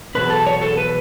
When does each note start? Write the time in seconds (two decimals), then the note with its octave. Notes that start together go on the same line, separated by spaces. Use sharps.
0.15 E2 B2 F#3 B4
0.30 A4
0.47 C#5
0.62 A4
0.77 B4